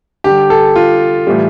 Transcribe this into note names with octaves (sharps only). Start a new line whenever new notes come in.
D3 G3 G4
A4
F4
A2 E3 G3